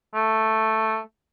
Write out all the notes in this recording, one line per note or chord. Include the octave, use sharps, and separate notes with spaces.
A3